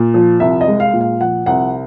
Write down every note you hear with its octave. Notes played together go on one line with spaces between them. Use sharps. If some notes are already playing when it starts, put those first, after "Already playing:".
Already playing: A#2
F3
C2 E5
D#5
G#3
F5
A#2
F5
F3 F#5
C2 F#5